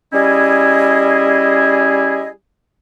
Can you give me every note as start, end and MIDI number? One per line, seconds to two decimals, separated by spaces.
0.13 2.30 55
0.13 2.30 61
0.13 2.30 64
0.13 2.30 68
0.13 2.30 75